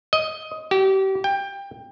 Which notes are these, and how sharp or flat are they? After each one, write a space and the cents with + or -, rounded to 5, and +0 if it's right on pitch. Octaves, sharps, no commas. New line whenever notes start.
D#5 +15
G4 -30
G5 +20